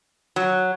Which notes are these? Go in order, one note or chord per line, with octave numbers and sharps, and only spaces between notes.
F#3